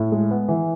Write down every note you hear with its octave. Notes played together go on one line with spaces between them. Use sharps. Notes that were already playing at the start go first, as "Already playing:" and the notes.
Already playing: A2
G#3
B3
E3